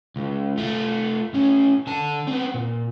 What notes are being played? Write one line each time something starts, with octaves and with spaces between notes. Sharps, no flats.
C#2
A3 F4
A2 C#4
D3 A5
B3 C4
A#2